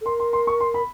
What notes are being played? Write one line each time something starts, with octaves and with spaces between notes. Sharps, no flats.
A4
A#4 C6
C6
C6
C#6
C6
B5